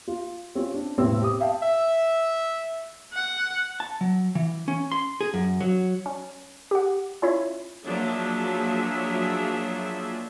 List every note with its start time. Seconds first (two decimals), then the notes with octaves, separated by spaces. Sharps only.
0.08 F4
0.55 C4 C#4 F4
0.74 D4
0.98 E1 C2 A2 C4 B4 E6
1.22 G4 D#6
1.40 E5 F5 G5 A5
1.62 E5
3.14 F#5
3.80 A5
4.01 F#3
4.35 E3
4.68 C#4
4.92 C6
5.21 G#4
5.34 F#2
5.61 F#3
6.06 C#4
6.71 G4 F#5
7.22 C#4 E4 F4 C#5 E5
7.85 F3 F#3 A#3 D4 G#4 E5